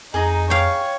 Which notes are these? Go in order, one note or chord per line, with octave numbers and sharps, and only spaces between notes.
F2 D#4 G#4 D#5 A#5
C#5 F5 G5